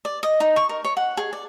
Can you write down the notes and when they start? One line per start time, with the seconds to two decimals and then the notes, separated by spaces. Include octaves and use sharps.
0.05 D5
0.23 D#5
0.40 D#4
0.56 C#6
0.69 A#4
0.84 C#5
0.97 F#5
1.17 G#4
1.33 D5